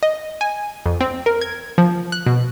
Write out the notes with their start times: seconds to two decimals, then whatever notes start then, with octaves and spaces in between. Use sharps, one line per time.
0.03 D#5
0.41 G#5
0.86 F2
1.01 C4
1.26 A#4
1.41 G#6
1.78 F3
2.12 F#6
2.26 B2